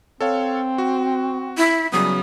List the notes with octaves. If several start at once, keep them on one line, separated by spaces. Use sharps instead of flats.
C4 A4 C#5 F5
F#4
E4
C#3 F#3 G3 B3 D#6